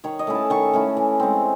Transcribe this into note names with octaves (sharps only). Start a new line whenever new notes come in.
D#3 C#5
D#5
A3 C#4 E4
A5
D#3 C#6
A3 C#4 E4
E3
G#3 C4